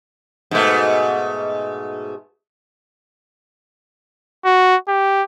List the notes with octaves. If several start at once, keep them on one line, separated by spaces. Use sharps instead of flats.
G#2 B2 A3
F#4
G4